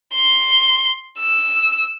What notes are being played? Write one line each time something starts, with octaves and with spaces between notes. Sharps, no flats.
C6
E6